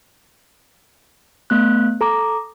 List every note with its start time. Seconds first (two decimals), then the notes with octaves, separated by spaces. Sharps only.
1.50 A3 B3 F#6
2.01 A4 A#5 D6